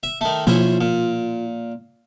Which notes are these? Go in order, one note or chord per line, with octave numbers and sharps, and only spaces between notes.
E5
D#3 A3
B2 F3 A#3 C#4 E4 F4 C5
A#2